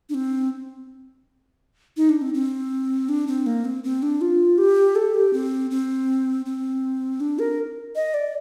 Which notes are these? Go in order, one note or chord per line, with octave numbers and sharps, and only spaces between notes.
D4
C4
D#4
D4
C4
C4
D4
C4
A#3
C4
C4
D4
F4
G4
A4
G4
C4
C4
C4
D4
A#4
D#5
D5